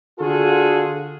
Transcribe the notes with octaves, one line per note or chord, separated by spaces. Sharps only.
D3 F4 F#4 G#4 A4